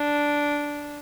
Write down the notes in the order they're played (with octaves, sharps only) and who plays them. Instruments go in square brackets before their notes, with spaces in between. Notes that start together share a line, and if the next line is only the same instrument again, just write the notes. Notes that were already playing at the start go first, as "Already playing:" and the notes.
Already playing: [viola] D4